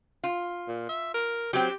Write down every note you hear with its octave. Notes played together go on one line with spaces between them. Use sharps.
F4
A#2
E5
A#4
F#3 C4 G4